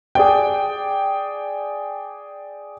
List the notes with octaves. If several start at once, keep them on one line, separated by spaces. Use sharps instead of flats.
G#4 D5 G5